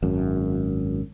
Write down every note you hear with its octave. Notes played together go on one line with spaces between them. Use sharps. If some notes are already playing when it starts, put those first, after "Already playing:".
G#1 F#2